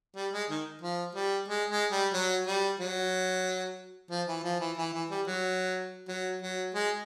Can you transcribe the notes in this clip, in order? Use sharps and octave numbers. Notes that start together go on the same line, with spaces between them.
G3
G#3
D#3
F3
G3
G#3
G#3
G3
F#3
G3
F#3
F3
E3
F3
E3
E3
E3
G3
F#3
F#3
F#3
G#3